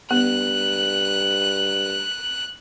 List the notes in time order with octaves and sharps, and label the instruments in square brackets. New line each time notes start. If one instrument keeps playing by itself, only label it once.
[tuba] G2 [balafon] B3 [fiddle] F#6